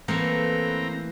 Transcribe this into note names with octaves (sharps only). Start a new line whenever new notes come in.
E3 A3 A#3 C4 A#5